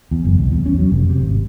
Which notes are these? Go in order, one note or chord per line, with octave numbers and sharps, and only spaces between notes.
E2
F#1
C2
E2
C#4
F#3
F1
C3
G#1